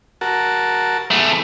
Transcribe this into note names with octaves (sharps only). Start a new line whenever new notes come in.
F#4 A#4 A5
E2 A3